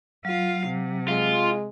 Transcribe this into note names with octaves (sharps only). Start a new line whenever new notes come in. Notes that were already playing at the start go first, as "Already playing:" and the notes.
F#3 F4 F5
C3
G#3 F4